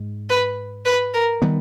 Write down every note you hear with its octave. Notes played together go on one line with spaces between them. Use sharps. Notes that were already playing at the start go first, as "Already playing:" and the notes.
Already playing: G#2 G#3
B4
B4
A#4
D#3 G3 B3